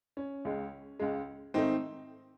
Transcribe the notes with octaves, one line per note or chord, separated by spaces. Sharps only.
C#4
C#2 C#3 G#3
C#2 C#3 G#3
G#2 D#3 A3 C4 D#4